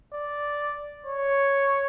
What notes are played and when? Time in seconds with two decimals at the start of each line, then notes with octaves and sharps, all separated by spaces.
0.13 D5
1.07 C#5